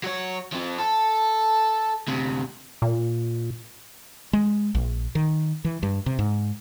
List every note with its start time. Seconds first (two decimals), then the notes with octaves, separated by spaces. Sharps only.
0.04 F#3 C#5
0.53 F3 C4
0.78 A4
2.08 D2 C3
2.82 A#2
4.33 G#3
4.75 A#1
5.15 D#3
5.65 E3
5.83 G2
6.06 C3
6.19 G#2